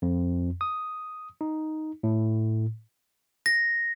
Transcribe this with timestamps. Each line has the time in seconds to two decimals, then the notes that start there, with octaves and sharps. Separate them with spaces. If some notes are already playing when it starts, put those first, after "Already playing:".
0.02 F2
0.61 D#6
1.41 D#4
2.03 A2
3.46 A#6